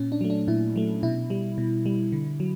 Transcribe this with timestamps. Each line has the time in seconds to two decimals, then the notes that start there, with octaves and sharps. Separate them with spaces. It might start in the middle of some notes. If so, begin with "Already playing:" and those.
Already playing: A#2 C#4
0.12 D4
0.21 F#3 A3
0.30 D4
0.48 A#2 E4
0.76 F#3 A3
1.03 B2 E4
1.30 G3
1.58 B2
1.86 G3
2.12 D3
2.40 F#3